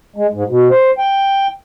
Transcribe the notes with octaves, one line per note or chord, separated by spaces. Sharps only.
G#3
G#2
B2
C5
G5